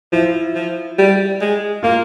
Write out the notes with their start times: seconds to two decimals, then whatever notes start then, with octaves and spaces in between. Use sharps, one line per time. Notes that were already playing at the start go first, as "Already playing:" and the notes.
0.13 F3 E4
0.55 F3
0.99 G3
1.41 G#3
1.83 A#3 F4